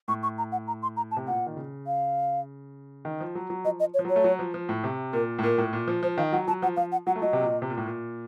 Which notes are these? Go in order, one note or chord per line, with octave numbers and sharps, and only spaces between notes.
A2 C#6
C#6
A#5
F#5
A#5
C6
A#5
A5
C3
A#2 F#5
D#3
C#3
F5
D#3
F3
F#3
F#3
F3 D#5
D#5
C#5
F3
F#3 C#5
A3
F#3
F3
F3
A2
C3
A#2 A#4
A2
A#2 A#4
A2
A#2
F3
F3 C5
D#3 F5
F#3 F#5
F#3 A5
F3 F#5
F3 F5
F#5
F#3 F#5
A3
F#3 D#5
C3
A#2
C3
A#2
A2
A#2